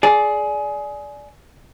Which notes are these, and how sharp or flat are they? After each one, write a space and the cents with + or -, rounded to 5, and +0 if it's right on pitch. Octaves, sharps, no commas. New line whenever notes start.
G#4 +20 D5 -5